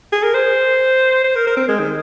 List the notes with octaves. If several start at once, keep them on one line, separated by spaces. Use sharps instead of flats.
G#4
A#4
C5
C5
A#4
A#4
C4
G#3
D#3